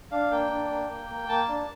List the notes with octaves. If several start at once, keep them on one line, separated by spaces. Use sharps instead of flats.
D4 F5
A#3 G5
D4
A#3
A#3
A#3
A#3 A5
D4